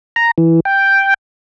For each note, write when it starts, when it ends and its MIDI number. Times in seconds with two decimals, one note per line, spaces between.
0.16 0.31 82
0.38 0.60 52
0.65 1.14 79